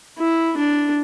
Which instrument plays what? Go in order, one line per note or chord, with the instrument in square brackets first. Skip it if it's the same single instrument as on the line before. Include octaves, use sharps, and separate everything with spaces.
[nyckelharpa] E4
D4